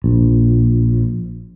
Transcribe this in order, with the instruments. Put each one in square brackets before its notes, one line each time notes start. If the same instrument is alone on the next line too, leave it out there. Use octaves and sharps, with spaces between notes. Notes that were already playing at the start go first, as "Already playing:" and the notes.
[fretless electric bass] A#1